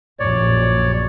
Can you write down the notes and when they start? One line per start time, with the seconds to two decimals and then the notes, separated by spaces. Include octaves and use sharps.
0.19 A#1 F#2 C#5 D5